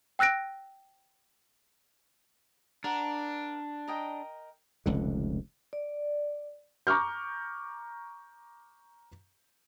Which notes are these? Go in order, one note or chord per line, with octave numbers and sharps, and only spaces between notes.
G5 E6 F#6 A#6 D7
D4 A#4 F#5
A#4 D#5 G5
F1 C#2 D3
D5
A#5 C#6 D6 F6 G6